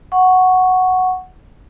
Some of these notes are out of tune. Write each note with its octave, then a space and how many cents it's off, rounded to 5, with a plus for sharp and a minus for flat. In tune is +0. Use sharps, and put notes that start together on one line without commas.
F#5 +0 C#6 +0